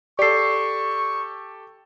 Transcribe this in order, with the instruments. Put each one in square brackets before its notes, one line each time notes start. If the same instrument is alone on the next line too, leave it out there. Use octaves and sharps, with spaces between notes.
[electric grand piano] G4 A4 [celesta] D5 C7 [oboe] C#6